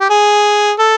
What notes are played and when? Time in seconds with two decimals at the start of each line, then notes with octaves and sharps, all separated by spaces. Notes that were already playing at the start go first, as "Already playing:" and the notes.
0.01 G4
0.10 G#4
0.79 A4